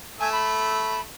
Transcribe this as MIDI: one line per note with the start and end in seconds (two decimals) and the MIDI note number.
0.20 1.01 57
0.20 0.31 80
0.20 1.01 88
0.32 1.01 83